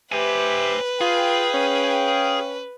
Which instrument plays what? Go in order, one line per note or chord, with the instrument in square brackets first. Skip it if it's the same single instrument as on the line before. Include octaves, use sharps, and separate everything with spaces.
[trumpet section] G4 E5 [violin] B4 [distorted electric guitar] C5 G#5
[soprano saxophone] F4 [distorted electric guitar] G#4 [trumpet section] F5 G5
[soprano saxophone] C#4